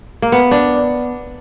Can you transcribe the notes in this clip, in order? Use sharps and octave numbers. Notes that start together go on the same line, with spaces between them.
A#3
B3
D4